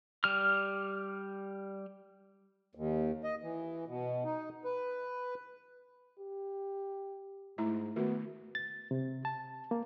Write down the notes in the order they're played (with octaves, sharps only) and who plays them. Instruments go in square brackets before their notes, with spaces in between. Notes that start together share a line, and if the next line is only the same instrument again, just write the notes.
[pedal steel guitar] G3 F6
[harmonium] D#2
D#5
E3
B2
D#4
B4
[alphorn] G4
[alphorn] G#2 [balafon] A3 E4 A#5
[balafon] D#3 A3 F#4 [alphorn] B3
[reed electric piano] A6
C3
A5
A#3